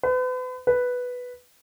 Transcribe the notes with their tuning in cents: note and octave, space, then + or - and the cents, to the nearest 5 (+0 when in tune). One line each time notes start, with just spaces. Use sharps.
B4 +40
B4 +0